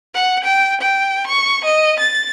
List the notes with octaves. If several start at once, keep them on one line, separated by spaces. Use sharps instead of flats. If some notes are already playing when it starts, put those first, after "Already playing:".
F#5
G5
G5
C#6
D#5
A6